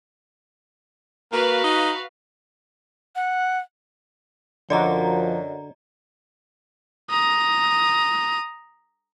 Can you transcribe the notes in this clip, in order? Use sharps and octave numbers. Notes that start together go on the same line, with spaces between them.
A#3 F#4 B4 F5
D#4
F#5
F#2 D3 F3 F#4 D5 D#5 A#5
A#5 D#6